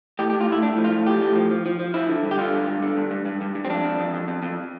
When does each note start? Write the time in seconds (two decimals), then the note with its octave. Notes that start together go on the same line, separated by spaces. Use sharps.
0.19 A2 G4
0.30 G4
0.33 A2
0.41 F4
0.49 A2 E4
0.62 A2 D4
0.77 F3
0.84 F4
0.92 A2
1.06 F3 G4
1.21 A2
1.35 F3
1.51 F3
1.66 F3
1.79 F3
1.94 F3 E4
2.09 D3
2.23 G2
2.31 G4
2.38 D3 F4
2.53 G2
2.67 G2
2.83 D3
2.97 G2
3.11 G2
3.25 G2
3.41 G2
3.55 G2
3.65 C4
3.70 F2 D4
3.85 F2
3.99 F2
4.14 F2
4.28 F2
4.42 F2